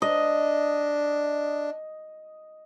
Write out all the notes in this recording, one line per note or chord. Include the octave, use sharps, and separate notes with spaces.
D4 D#5